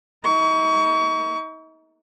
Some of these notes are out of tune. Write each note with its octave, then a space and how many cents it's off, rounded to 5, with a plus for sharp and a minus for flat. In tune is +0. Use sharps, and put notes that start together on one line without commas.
D#4 +40 C#6 +30